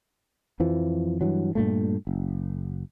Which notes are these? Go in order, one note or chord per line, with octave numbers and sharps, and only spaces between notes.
F2 E3 F3
G2 E3 F#3
G2 A#2 A3
F#1